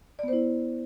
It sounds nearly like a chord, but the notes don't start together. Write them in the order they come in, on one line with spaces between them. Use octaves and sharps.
D5 B3 C5 E4